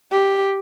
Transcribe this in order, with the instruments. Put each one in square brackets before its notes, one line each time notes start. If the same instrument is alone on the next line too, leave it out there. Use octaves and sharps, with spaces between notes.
[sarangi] G4